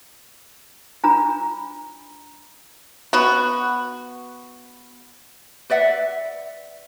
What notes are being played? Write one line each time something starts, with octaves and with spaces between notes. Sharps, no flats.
D4 F4 A#5 B5
B3 F#4
B4 D5 E5 F#5